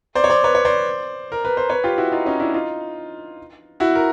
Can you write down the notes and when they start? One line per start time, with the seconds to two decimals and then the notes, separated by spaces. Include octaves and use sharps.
0.15 C5 D5
0.24 C#5
0.30 C5 D5
0.44 B4 C#5
0.55 C#5
0.65 C5 D5
1.32 A#4
1.45 B4
1.57 C5
1.69 B4 C#5
1.84 F4 G4
1.98 E4 F#4
2.12 D#4 F4
2.26 C#4 D#4
2.40 D4 E4
2.54 D#4 F4
3.80 E4 F#4
3.95 A#4